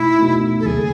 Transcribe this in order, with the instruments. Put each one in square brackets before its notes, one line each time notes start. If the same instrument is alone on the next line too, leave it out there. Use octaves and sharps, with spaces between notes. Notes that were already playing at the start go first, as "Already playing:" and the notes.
Already playing: [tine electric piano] B2 A3 D#4 [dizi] E4
[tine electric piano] B2 A3 D#4
[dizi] A4
[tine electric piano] D#2 C#3 F#3 [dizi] G#4